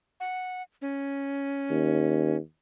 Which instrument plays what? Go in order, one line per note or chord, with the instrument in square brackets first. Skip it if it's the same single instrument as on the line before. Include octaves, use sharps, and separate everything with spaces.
[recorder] F#5
C#4
[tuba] D#2